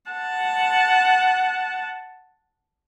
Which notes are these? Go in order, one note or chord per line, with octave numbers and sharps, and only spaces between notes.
F#5 A5